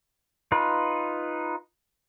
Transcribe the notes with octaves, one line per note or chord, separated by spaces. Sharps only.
D#4 F4 B4